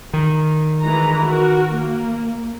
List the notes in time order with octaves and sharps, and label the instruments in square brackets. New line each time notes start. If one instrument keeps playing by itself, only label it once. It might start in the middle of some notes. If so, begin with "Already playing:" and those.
[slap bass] D#3
[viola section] E3 G#3 A#5
F#4 A#4
A#3